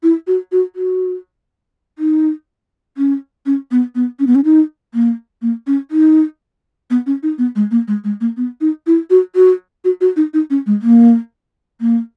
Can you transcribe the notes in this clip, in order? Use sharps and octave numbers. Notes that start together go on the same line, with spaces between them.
E4
F#4
F#4
F#4
D#4
C#4
C#4
B3
B3
C#4
B3
C#4
D#4
A#3
A#3
C#4
D#4
B3
C#4
D#4
B3
G#3
A#3
G#3
G#3
A#3
B3
D#4
E4
F#4
F#4
F#4
F#4
D#4
D#4
C#4
G#3
A#3
A#3